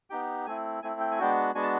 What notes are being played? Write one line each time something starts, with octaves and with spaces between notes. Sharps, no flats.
B3 D#4 G4 G5
A3 C4 E4 G#5
A3 C4 E4 G#5
G5
G#5
G#3 B3 D4 F#4 G5
G#3 B3 D4 F#4 G#5
A5